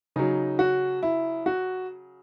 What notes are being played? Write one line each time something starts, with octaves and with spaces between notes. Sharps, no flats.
C#3 F#3 D#4
F#4
E4
F#4